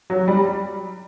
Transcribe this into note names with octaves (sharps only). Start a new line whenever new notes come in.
F#3
G3